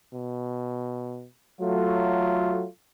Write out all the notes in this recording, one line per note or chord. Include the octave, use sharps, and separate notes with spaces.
B2
F#3 A3 F4